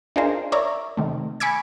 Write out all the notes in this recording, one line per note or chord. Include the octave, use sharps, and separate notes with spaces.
D4 D#4 F4 G#4 A#4 C5
A#4 C#5 D5 E5 A#5
C3 D#3 A3
G#5 B5 C#6 D6 E6 G#6